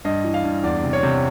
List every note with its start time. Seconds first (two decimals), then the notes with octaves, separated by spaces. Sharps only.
0.05 G2 D#5
0.24 E3
0.34 F5
0.44 G2
0.64 E2 D5
0.84 C3
0.93 C#5
1.03 C3